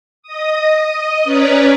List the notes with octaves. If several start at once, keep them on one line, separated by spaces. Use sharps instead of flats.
D#5 D#6
C#4 B4 C#5 D5 A#5